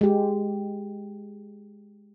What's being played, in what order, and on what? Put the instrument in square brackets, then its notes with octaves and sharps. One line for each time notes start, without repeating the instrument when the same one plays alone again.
[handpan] G#3 G4